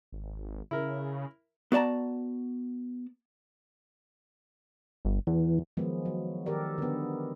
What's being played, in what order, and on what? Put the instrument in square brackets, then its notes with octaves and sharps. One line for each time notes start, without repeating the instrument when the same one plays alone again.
[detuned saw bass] G#1
[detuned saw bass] C#3 [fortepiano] E4 A#4
[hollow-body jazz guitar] B3 F#4 D5 A5 A#5
[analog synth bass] G1
[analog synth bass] E2 [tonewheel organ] E3
[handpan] D#3 F3 F#3 G#3 B3
F#3
D#3 G4 A4 A#4 D5
D3 B3